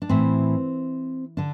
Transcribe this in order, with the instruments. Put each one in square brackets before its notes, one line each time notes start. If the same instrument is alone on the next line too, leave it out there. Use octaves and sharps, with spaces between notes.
[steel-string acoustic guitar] D4
A2 E3 C4
D3 D4